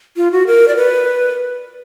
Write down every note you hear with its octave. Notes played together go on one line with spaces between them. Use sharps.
F4
F#4
A#4
D5
B4